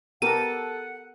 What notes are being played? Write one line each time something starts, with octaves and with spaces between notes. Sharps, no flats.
B3 G4 A4 A#4 F#5 D#7